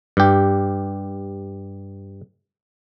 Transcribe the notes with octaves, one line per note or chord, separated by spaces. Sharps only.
G2 G4